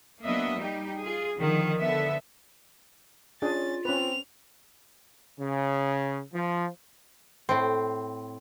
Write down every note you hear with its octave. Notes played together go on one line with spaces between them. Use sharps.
F#3 A#3 B3 D4 D#5 E5
G3 D#4 G4
F4 G#4
D3 D#3 F3
D3 B3 A4 E5
C#4 D4 F4 G#4 A6
C4 C#4 B4 F7
C#3
F3
A2 C4